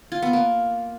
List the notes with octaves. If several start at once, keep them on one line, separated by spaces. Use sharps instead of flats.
F4
B3
A#3